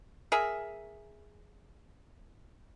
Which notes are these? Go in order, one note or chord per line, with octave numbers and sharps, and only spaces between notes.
G#4 A#4 E5